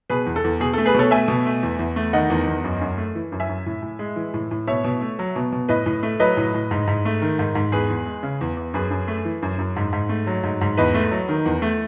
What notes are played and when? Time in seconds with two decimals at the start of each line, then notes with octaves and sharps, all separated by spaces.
0.10 B2 G#4 B4
0.26 E2
0.36 A4
0.44 E2
0.60 B2 G#4
0.74 A4
0.78 A3
0.86 G#4 B4
0.94 B2 A4 C#5
1.11 A3 E5 G#5
1.28 B2
1.46 A3
1.63 E2
1.79 E2
1.96 A3
2.13 D#3 D#5 F#5
2.30 E2
2.47 E2
2.64 F#2
2.81 F#2
2.98 A3
3.15 E3
3.32 F#2
3.40 E5 G#5
3.49 F#2
3.66 A2
3.82 A2
3.99 G#3
4.16 E3
4.34 A2
4.51 A2
4.67 B2 C#5 E5
4.84 B2
5.01 A3
5.19 F#3
5.36 B2
5.52 B2
5.69 A2 B4 D#5
5.86 A2
6.03 A3
6.20 F#3 B4 D#5
6.37 A2
6.55 A2
6.71 G#2
6.88 G#2
7.05 A3
7.22 D#3
7.39 G#2
7.55 G#2
7.72 E2 G#4 B4
7.90 E2
8.06 G#3
8.23 C#3
8.41 E2
8.57 E2
8.74 F#2 G#4 B4
8.91 F#2
9.08 A3
9.25 E3
9.42 F#2
9.58 F#2
9.76 G#2
9.93 G#2
10.09 A3
10.27 F#3
10.43 G#2
10.61 G#2
10.77 E2 B4 D#5
10.94 A3
11.11 F#3
11.29 D#3
11.46 E2
11.62 A3